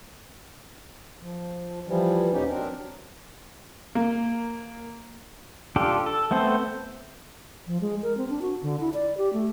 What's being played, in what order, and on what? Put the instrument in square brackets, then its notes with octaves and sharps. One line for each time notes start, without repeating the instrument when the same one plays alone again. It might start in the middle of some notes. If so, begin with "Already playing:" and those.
[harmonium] F3
E3 F3 G3
D#2 A#2 B3 C#4 D#4 G4
F#3 C4 D4 A#4
[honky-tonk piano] A#3
[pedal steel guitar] D4 F4 G4 A4
A4
A3 B3 C4 A4 C5
[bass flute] F3
G#3
A#4
C4
D4
F#4
D3
E4
D5
G4
A3